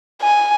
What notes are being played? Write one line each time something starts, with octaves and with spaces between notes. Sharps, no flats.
G#5